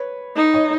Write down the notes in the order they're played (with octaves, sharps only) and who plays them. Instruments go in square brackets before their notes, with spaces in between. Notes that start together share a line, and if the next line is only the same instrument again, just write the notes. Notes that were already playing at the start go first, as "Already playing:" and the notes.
Already playing: [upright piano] B4 C#5
[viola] D#4
[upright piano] C#5 D#5